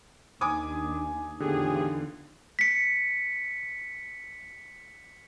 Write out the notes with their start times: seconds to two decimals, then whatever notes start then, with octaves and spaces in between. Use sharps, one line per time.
0.41 D#2 D4 G#5 D6 D#6
1.40 E2 A2 D3 D#3 F4 G4 G#4
2.59 B6 C#7